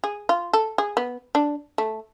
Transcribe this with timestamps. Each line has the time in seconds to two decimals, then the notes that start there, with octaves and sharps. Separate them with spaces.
0.04 G#4
0.29 F4
0.53 A4
0.78 G#4
0.97 B3
1.35 D4
1.78 A3